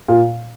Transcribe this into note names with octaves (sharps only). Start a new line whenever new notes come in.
A#2